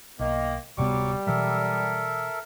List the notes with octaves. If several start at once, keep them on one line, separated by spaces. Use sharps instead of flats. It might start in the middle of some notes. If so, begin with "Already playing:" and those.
B1 D#3 A#3
D1 C3 F#3 G3 B3 C#6 D6
B2 E3 F#3 A4 A#4 E5